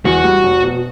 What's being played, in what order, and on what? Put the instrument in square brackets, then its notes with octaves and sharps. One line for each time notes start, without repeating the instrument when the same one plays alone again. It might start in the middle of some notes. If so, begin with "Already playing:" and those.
[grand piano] E2 [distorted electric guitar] F#4
[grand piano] G3
F1
B2